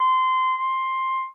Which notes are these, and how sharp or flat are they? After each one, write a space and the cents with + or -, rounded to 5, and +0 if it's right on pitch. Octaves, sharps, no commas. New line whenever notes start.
C6 -20
C6 +10